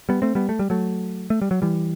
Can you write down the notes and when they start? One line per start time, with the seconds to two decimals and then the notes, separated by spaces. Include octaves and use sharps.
0.09 G3 B3
0.22 A3 C4
0.35 G3 B3
0.49 A3
0.59 G3
0.70 F#3 A3
1.30 A3
1.42 G3
1.51 F#3
1.62 E3 G3